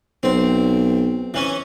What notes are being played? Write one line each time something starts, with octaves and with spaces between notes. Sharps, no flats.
B1 C4
E3 C#4